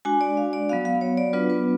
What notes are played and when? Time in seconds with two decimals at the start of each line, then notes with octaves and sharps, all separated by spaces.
0.05 G#3 D4 F#4 G#5
0.21 D5
0.37 F5
0.53 D5
0.69 F#3 B3 F#4 F5
0.85 F5
1.01 C#5
1.17 D5
1.33 F#3 B3 D4 F4 B4
1.50 B4